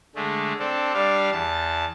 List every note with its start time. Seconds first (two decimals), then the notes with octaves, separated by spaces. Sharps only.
0.15 D3 G#3 A3
0.59 C4 D4 A4
0.94 G3 D4 F5
1.32 E2 A5